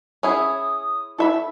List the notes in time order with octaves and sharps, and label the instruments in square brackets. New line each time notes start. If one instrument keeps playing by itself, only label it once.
[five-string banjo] C#4 E4 G#4 [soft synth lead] D#6
[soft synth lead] E4 [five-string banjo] A4 E5 B5